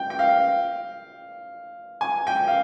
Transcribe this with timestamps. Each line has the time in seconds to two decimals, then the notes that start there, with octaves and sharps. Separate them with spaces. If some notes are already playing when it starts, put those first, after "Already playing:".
Already playing: G5
0.10 G5
0.19 F5
2.01 G#5
2.27 G5
2.48 F5